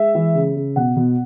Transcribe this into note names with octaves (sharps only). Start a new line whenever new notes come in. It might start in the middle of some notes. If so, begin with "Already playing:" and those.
Already playing: G#3 E5
E3
C#3
C#3
B2 F#5
B2